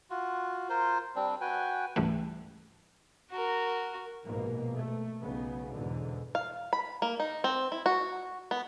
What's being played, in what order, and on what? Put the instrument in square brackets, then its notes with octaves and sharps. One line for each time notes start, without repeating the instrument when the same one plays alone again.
[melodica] F4 F#4
F4 A#4 C5
G3 C4 D4
F#4 B4 G5 G#5
[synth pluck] C#2 G#2 E3 G3 A3
[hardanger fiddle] F#4 A#4
[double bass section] A#1 G#2 B2 A#3
A3
B1 C#3 B3
E2 G#2 B2 D3
[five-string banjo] F5
B5
A#3
D#4
C4
E4
F#4
B3